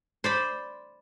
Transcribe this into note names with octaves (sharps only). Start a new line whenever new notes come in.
C5 D5 B5